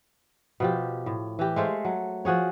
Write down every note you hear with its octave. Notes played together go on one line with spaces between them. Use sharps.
B2 F3 G4
A2
E3 G4
G#3 A3 C5 F5
F#3
F3 F#4 G#4 C#5